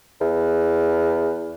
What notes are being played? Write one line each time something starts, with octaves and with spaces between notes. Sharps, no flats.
E2